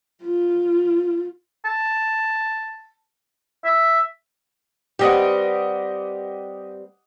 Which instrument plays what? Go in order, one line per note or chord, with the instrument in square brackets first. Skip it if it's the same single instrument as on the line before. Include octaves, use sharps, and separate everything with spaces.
[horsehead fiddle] F4
[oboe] A5
E5
[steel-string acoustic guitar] G3 C4 B4 [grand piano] G4 D#5 F#5